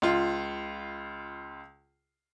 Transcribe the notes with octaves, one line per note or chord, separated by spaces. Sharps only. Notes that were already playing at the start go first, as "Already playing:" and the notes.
C#2 F4